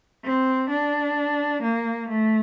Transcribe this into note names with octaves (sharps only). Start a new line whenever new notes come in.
C4
D4
A#3
A3